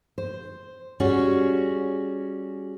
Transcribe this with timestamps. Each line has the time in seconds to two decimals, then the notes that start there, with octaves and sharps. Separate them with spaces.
0.18 C5
1.00 G3 C#4 F#4 G#4